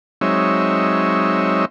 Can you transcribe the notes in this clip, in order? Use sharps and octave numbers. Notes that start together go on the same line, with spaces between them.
F#3 G#3 C4 D#4 C#5 E5